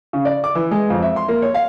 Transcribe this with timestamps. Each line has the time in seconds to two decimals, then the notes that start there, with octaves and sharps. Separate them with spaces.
0.13 C#3
0.25 D5
0.44 D6
0.55 E3
0.71 G#3
0.90 F2
1.02 E5
1.16 C6
1.28 A#3
1.42 C#5
1.54 F5